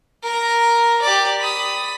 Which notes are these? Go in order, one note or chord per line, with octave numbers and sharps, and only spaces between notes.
A#4 A#5
G4 D5
B5 D#6